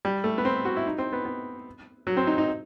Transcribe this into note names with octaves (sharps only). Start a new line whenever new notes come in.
G3
A3
B3
C4
F#4
E4
D#4
C4
B3
B3
F#3
C4
D#4
D#4